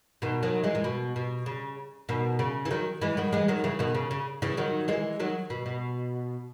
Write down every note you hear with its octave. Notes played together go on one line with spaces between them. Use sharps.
B2 D#3
D#3 F#3
E3 G#3
A#2
B2
B2
C#3
B2 D#3
C#3
E3
D#3 F#3
E3 G#3
D#3 F#3
E3 G#3
D#3 F#3
C#3 E3
B2 D#3
C#3
C#3
C#3 E3
D#3 F#3
E3 G#3
D#3 F#3
B2
B2